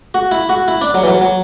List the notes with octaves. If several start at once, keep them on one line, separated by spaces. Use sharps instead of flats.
F#4
E4
F#4
E4
D4
F#3
E3
F#3
F#3